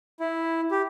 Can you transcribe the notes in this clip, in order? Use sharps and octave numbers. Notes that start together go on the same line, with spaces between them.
E4
G4